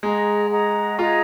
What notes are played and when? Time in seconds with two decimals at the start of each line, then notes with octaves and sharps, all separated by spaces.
0.03 G#3 G#4 D#5 F#5 A#5
0.50 G#4 D#5 F#5 A#5
0.98 F4 G#4 D#5 F#5 A#5